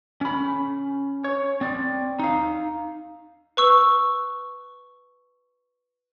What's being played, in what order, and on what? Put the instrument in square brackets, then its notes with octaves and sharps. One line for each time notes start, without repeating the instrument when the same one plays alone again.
[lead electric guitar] C#4 B5
C#5
C4 D5
D#4 F5
[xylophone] B4 C#6 E6